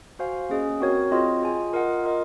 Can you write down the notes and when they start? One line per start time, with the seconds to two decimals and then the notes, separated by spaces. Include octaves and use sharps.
0.19 F#4 C5 F5 G#5
0.49 A#3 C#4 G#4 D#5 G#5
0.80 C4 F#4 A#4 C#5
1.11 C4 F4 G#4 D#5
1.43 F4 G#4 D#5 G#5
1.73 F4 A#4 D#5 F#5
2.04 F4 A#4 D#5